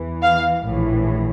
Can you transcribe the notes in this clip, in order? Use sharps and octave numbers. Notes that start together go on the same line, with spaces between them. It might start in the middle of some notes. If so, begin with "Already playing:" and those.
Already playing: E2 E3
F5
A#1 A2 E3